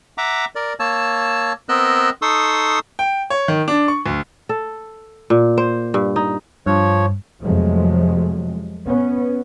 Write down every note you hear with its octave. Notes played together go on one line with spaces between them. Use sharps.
E5 F#5 A#5 D6
A#4 D5
A#3 C#5 A5 E6
B3 C4 A#4 D#5 E6 F#6
D#4 A4 C6 C#6 D#6 E6
G5
C#5
D#3
D4
C#6
D2
A4
A#2
C5
G2
D#4
G2 F3 C#5
F2 C3 F3 F#3 G#3 A3
B3 C#4